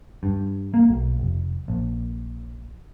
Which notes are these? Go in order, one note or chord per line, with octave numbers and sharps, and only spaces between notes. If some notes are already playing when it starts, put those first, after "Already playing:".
G2
A#3
B1
F1
A#1